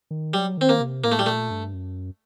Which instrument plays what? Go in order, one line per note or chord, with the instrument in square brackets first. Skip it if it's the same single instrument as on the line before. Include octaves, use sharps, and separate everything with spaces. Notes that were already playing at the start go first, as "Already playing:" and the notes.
[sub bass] D#3
[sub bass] F#3 [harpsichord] G3
[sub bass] D#3 [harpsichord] C4
[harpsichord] A#3
[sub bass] C3
[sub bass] A2 [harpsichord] A#3
[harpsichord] A3
G3
[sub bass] A#2 [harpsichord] A3
[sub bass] G2
F#2